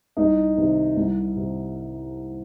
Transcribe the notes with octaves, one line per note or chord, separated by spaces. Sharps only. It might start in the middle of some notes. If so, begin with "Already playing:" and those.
C2 D#4
C3 D#3
C2
C3